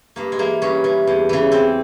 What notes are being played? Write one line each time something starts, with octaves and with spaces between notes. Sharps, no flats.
G2 A#3
G#3
E3 A#3
G2 C#4
E3
E2
C#3 E3
E2 C4